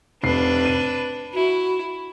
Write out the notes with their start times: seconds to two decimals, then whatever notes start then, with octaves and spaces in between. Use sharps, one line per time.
0.23 F1 D4 B4 C7
0.66 D#7
1.34 E4 F#4